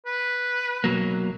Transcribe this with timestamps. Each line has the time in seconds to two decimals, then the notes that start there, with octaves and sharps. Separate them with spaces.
0.06 B4
0.84 B1 F#3 A#3